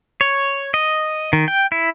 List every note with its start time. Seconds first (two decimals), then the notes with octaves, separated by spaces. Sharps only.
0.21 C#5
0.74 D#5
1.33 D#3
1.48 G5
1.72 E4